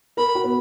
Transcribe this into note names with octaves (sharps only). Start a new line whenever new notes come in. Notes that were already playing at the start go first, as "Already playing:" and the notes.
A#4 B5
F#4
B3